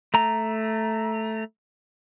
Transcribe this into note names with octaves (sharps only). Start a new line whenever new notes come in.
A3 A#5